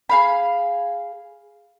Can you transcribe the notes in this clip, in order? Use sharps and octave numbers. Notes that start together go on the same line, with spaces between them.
G#4 F5 B5